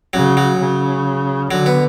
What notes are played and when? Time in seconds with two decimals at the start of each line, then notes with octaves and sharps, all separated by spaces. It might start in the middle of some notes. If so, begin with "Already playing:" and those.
0.13 C#3 F#3
0.37 F#3
0.59 C#3
1.51 D3 F#3
1.66 B3